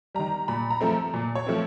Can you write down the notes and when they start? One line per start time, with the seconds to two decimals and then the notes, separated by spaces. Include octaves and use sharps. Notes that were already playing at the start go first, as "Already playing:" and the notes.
0.15 D#3 G3 A#5
0.48 A#2 B5
0.70 A#5
0.81 F3 A3 C4
1.14 A#2
1.35 C#5
1.47 F3 A3 C4